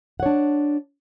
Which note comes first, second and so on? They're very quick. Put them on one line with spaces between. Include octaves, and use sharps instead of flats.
F#5 C#5 D4